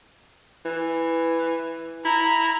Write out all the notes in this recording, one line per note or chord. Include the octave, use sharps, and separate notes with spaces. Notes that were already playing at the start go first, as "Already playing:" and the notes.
E3
E4 A#5